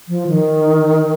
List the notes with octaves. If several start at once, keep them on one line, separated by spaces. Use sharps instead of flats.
F3
D#3